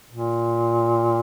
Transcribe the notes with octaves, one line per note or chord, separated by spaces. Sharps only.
A#2